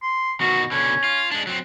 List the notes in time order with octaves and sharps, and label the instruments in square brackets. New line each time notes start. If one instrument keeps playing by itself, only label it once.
[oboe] C6
[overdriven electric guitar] B2 D#3 [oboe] F#4
[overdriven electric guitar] B2 D3 [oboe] C#4
[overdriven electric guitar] F4
G#3 D4
F#3 C4